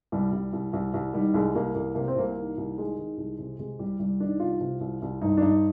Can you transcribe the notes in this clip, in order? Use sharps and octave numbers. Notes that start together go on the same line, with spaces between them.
C2 G3
C2
C2
C2
C2
D#3 G3
C2 G#3
C2 A#3
C2 A#3
C3 A#3
C4
C2 A#3
D#3
C2
D#3 G#3
D#3
C2
C3
C3 G#3
C2 G3
C2 G3
D#3 D4
C2 F4
C3
C2
C2
G2 D#4
D4
G2 D#4